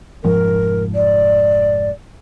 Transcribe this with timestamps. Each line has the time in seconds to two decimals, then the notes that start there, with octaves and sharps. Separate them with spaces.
0.24 F1 G#2 F3 A#4
0.95 D5